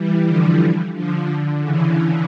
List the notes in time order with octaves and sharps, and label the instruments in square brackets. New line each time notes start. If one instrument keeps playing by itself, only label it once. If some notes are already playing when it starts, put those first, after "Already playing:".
Already playing: [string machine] E3 G3
D3 F3
D3 F3
D3
C#3 E3